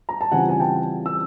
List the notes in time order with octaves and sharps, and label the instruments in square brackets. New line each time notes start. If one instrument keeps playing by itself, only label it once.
[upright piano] A#5
A5
C#3 E3 G3 C4 F4 F#5 G#5
G#5
G5 A5
E6